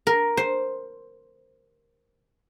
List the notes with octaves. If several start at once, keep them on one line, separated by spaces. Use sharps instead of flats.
A#4
C5